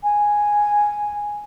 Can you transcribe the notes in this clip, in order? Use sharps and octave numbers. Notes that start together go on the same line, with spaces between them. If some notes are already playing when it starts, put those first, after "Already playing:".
G#5